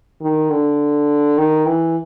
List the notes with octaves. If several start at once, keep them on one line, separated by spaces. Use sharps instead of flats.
D#3
D3
D#3
E3